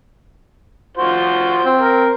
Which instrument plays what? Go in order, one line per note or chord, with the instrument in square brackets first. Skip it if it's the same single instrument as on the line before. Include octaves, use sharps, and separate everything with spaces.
[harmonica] F4 F#4 C5
[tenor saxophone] C4
[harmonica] A#4